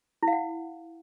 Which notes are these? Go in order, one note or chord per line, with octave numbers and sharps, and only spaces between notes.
E4
F5
F#5